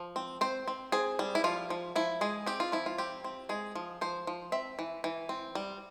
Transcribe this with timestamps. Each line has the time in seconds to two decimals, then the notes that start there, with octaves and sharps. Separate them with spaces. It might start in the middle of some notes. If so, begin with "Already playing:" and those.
Already playing: F3
0.16 C4
0.41 C4 C5
0.68 C4
0.92 C4 G#4
1.19 G3
1.35 E4
1.44 F3 F4
1.70 F3
1.96 F3 E4
2.21 G#3 G#4
2.46 C4 G4
2.60 F4
2.72 F3 E4
2.86 F4
2.98 C4 G4
3.24 C4
3.49 G#3 G#4
3.75 F3
4.01 F3 C5
4.27 F3
4.52 C4 E5
4.79 E3
5.04 E3
5.29 C4
5.55 G3